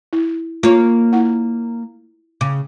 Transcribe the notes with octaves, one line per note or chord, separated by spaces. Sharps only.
E4
A#3 F4 C#5
E4 F#5
C#3 D6